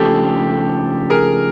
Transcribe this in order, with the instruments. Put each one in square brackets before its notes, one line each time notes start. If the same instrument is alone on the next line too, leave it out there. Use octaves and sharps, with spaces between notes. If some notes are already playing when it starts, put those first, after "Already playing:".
Already playing: [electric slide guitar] C#3 F3 A3 D4 [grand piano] G4 A4
[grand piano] G#4 A#4